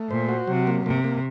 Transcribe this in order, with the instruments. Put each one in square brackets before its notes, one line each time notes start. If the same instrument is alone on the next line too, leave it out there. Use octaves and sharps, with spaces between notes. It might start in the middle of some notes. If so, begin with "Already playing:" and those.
Already playing: [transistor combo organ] A3
[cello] A#2 [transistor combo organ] C5
[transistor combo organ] F#4
[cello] C3 [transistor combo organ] F#3
[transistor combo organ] A#3
[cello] C3 [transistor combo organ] A#3
[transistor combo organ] A#3